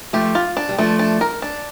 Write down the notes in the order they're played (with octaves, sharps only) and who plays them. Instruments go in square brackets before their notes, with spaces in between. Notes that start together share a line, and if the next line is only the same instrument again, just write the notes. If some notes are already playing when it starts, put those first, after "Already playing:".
[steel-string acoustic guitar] F3 A3 [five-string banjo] G4
[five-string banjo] F4
D4
[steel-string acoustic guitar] G3
[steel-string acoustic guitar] F3 A3 [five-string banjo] D4
[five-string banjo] D4
A#4
D4